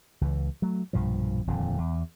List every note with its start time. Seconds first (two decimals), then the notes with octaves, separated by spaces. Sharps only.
0.21 C#2 E3
0.62 F#3 A3
0.93 B1 G2 A#2 F3
1.47 D#1 F2 A#2 D3
1.78 E2